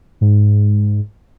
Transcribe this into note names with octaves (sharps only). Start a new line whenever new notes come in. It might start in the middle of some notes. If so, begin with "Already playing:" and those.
G#2